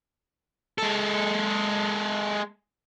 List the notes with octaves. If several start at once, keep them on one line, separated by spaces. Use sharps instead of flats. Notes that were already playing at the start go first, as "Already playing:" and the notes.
G#3 A4